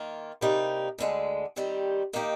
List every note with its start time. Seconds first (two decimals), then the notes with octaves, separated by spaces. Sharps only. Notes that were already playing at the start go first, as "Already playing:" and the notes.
Already playing: D#3 A#3 F4
0.41 C3 G3 A#3 D#4
0.98 D2 D3 G#3
1.56 D#3 G3 C4 G4
2.13 D#3 A#3 D#4 G4